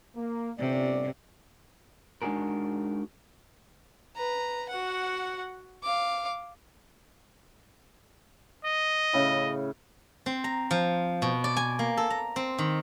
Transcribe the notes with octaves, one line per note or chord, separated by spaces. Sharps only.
A#3
G1 C3 C#4 D5
G#3 D4 D#4 F#4 G#4 A#4
B4 A#5
F#4 F#5
F5 D6
D#5
A2 C#3
C4
A#5
F3
B2
D5
G#5
A#3
A4
A#5
C4
D#3